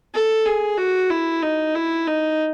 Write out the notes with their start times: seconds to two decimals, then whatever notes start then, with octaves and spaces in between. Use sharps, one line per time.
0.14 A4
0.45 G#4
0.77 F#4
1.10 E4
1.42 D#4
1.75 E4
2.07 D#4